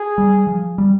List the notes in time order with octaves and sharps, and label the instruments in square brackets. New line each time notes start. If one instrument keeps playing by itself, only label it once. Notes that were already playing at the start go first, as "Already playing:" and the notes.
Already playing: [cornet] G#4
[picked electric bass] G3
F3
G3